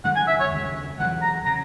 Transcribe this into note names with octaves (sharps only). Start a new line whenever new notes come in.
F#1 F#2 D#3 G#3 F#5
G#5
E5
C#5
D#2 C#3 G#3
E1 E2 D#3 F#3 F#5
A#5
C#3 A#5